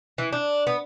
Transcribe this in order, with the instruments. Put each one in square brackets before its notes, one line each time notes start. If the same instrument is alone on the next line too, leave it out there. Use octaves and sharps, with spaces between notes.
[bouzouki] E3
D4
B3